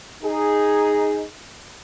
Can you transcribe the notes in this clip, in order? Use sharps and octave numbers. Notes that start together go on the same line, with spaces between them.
D#4 G#4